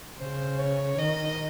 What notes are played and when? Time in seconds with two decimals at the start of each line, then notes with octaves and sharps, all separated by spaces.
0.19 C#3 C5
0.58 C#5
0.98 D#3 D#5